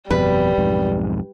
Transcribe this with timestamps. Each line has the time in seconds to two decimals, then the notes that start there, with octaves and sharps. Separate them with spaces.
0.10 G1 F2 B2 G3 B4
0.58 B1 F2 G#2